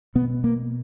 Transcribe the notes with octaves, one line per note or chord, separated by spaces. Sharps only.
B2 B3
A#3